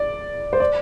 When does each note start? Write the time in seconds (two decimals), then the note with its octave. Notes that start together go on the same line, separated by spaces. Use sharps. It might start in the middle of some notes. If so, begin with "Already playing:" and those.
Already playing: D5
0.53 C5
0.60 D5